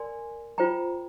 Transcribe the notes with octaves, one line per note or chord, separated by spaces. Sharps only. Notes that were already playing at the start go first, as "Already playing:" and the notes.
Already playing: A#4 D5 G#5 C6
F4 C5 G5 A#5